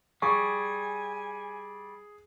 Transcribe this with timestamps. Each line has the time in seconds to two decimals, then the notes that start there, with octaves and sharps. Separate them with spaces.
0.22 G3 G#4 G#5 C#6